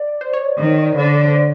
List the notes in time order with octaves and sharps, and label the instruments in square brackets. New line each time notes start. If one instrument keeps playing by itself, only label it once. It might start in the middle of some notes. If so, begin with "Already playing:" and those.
Already playing: [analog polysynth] D5
C5
C#5
[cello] D#3
D3